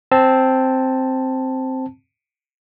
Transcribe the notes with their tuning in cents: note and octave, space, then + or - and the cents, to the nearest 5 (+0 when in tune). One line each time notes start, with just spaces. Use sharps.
C4 +0 A5 +0